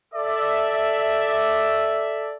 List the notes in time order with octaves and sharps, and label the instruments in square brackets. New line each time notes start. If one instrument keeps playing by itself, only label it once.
[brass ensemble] A4 D5 E5